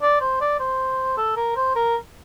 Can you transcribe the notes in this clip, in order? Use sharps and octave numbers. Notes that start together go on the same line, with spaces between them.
D5
C5
D5
C5
A4
A#4
C5
A#4